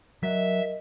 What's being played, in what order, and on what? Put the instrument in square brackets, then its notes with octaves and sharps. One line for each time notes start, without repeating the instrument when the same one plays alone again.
[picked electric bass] F#3 [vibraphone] A#4 D#5 [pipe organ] E5